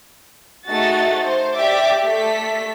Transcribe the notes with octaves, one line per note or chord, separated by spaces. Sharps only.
A3 D#4 F#4 G#4 A6
C5
G4 D5 E5 D6
A3 A4 B6